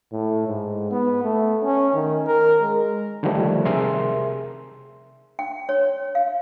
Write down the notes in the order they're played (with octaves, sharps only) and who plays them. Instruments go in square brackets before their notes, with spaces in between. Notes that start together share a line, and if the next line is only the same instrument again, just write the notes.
[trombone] A2
G#2
B3
A3
C#4
D#3
A#4
G#3
[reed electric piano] D3 D#3 F3 G3 A3
C3 G#4 A#4 E5 C6
[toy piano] G5
C#5
F5